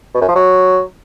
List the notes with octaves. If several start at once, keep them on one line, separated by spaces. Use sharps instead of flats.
B2
F#2
F3
F#3